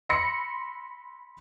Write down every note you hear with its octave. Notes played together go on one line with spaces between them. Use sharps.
B5 C6 E6 A#6 C#7